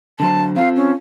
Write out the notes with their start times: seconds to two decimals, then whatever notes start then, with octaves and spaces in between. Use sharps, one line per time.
0.20 D3 F#3 C5 A5
0.56 C4 F4 A4 F5
0.76 C#4